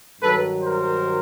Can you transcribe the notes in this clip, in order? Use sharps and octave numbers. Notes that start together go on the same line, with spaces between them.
G2 D#3 F#3 A4 B4
A#4 C5